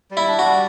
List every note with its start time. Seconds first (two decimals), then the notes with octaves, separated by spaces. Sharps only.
0.11 G3
0.17 E4
0.28 D4
0.39 F#4
0.45 G3